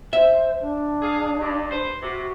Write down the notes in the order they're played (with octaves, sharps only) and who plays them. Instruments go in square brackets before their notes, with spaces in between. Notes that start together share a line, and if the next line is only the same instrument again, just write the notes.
[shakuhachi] C5 [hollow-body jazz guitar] E5
[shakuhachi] D4
[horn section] G#4 F5
G2
B4 C5
[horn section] C3 [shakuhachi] F#4